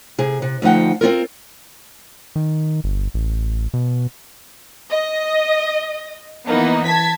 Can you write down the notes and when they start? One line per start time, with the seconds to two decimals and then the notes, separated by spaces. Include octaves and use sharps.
0.18 C3 G#4
0.42 C3
0.62 D2 F3 D#4 F#5 G5
1.01 C4 D#4 F4 A#4
2.36 D#3
2.84 G1
3.14 A1
3.74 B2
4.89 D#5
6.46 E3 A#3 B3 D#4
6.84 A5 G#6 B6